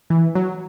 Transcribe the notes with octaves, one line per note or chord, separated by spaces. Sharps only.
E3
F#3